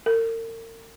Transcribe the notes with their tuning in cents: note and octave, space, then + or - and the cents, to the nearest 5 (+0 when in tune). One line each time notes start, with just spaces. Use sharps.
A#4 -40